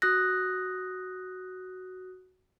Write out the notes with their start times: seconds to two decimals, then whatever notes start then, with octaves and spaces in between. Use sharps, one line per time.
0.02 F#4 D#6 F#6 A#6